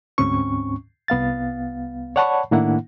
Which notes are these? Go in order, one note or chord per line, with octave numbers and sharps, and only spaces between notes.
D2 G#2 C4 C#4 C#6
C2 B3 F5 A6
C#5 D5 F#5 A5 B5 C#6
A2 D#3 A#3 D4 E4 F#5